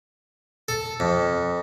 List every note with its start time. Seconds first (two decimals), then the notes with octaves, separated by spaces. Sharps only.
0.68 A4
1.00 F2